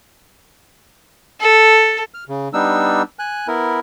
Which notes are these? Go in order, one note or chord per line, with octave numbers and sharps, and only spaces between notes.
A4
F6
C#3
G3 B3 D4 D#4 E6
G#5 F#6
B3 E4 A#4